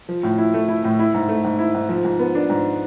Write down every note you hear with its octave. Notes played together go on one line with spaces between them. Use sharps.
F3
A2
E4
A3
E4
A2
E4
G#2
A3
G#2
E4
G#2
F3
G#2
B3
D4
G#2